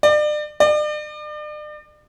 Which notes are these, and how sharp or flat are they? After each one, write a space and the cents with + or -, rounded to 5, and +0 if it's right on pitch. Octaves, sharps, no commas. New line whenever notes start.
D5 +35
D5 +40